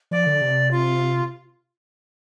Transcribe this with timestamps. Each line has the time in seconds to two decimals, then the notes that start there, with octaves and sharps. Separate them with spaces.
0.11 F3 D5
0.27 D3
0.41 C3
0.71 F4